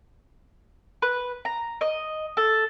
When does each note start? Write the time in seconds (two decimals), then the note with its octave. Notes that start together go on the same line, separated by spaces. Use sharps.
1.02 B4
1.45 A#5
1.81 D#5
2.37 A4